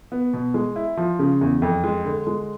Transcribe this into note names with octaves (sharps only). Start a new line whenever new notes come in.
B3
B2
G#3
E4
F3
C#3
E2
F2
G#3
D3
G#3